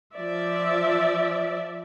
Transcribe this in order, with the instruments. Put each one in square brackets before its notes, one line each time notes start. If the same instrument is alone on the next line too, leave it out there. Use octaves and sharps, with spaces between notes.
[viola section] F3 D5 E5